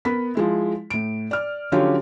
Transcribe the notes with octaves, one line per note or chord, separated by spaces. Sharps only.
B3 A#4 B5 B6
F3 G#3 E4
A2 D7
D5 F6
D3 F3 F#3 C#4 F4 G4